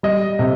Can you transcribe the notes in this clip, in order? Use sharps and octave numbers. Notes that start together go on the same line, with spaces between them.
G3 D#5
C3